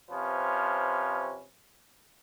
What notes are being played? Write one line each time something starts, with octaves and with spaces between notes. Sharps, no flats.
C3 F3 C#4 B4